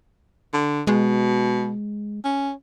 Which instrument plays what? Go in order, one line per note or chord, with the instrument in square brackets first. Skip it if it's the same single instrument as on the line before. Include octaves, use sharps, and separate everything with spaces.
[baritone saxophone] D3
[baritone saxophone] B2 [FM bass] G#3
[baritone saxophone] C#4